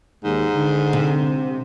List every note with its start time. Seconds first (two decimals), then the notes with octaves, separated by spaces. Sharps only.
0.24 D#2 G#2
0.55 D3
0.93 C3